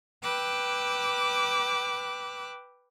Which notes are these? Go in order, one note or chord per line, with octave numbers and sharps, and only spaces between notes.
B4 G5 D6 E6 F#6